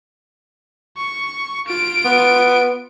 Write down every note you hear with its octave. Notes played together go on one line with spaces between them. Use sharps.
C#6
F4 D7
B3